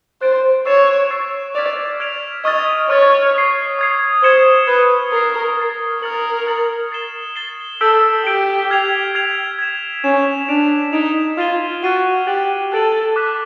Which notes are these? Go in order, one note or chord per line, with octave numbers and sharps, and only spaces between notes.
C5 F#6 A6 D7
C#5 C#6 E6 A6 C7 E7
C#6 E6 A6 C7 E7
D5 F6 G#6 B6 D7 F7
F6 G#6 B6 D7 F7
D#5 C#6 F6 A6
C#5 C#6 F6 A6
D#6 G#6 C7
D#6 G#6 C7
C5 G#6 C#7 E7 G7
B4 G#6 C#7 E7 G7
A#4 F6 A6 C7
F6 A6 C7
A#4 F6 A6 C#7 F#7
F6 A6 C#7 F#7
A6 C7 E7 G7
A6 C7 E7 G7
A4 E6 G6 B6 D7 G7
G4 E6 G6 B6 D7 G7
F6 G#6 C7 F7
F6 G#6 C7 F7
G#6 B6 E7
C#4 G#6 B6 E7
D4 G#6 B6 D7 F7
D#4 G#6 B6 D7 F7
F4 F6 A6 C7 D#7 G7
F#4 F6 A6 C7 D#7 G7
G4 F#6 A6 D7 F#7
A4 F#6 A6 D7 F#7
D6 F#6 B6